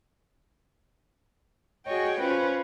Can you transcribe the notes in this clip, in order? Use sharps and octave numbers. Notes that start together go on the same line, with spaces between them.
F#4 G#4 C#5 D#5 G5
C#4 F4 B4 C5